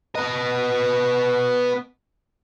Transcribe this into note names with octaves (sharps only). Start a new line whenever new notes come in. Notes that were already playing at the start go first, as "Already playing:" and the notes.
B3 B4 D#5